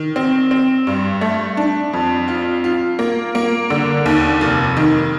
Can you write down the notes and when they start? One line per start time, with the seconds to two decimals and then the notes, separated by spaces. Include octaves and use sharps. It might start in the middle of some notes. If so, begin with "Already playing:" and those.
Already playing: D#3
0.16 C4
0.51 C4
0.87 G2
1.21 A3
1.57 D4
1.93 F2
2.28 F4
2.64 F4
2.99 A#3
3.35 A#3
3.70 D3
4.06 D#2
4.41 F1
4.77 D#3